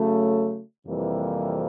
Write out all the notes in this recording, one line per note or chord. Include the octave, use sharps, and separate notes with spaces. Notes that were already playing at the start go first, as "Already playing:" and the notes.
Already playing: C#3 F#3 A3
F2 C3 E3 G3 A#3